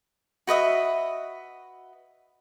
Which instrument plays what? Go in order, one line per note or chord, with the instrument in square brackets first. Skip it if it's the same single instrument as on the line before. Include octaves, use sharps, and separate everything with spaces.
[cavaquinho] F#4 B4 D#5 E5